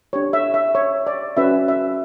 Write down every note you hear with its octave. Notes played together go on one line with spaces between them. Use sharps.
D4 G4 C#5
E5
E5
C#5
D5
C#4 F#4 B4 E5
E5